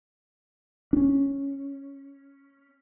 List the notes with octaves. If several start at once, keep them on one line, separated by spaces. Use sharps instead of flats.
C#4 D4